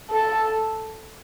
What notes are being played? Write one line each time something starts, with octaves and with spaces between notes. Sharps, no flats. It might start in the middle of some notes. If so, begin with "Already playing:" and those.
A4